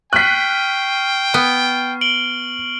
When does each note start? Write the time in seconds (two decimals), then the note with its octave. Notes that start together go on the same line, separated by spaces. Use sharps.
0.13 G5 C#6 F6 F#6 B6 C7
1.34 B3 F6
2.01 D7 F#7 G7